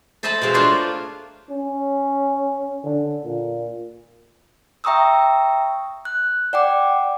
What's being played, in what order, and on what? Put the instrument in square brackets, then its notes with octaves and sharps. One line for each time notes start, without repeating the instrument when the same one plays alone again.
[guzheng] A4 C5 D#5 E5 A5 B5
B2 G#3 C4 F5
A3 A#3 D4 F4 C5 C#5
[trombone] C#4
D3
A#2
[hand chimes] E5 G5 A#5 C#6 D#6 E6
F#6
D5 F#5 G5 D6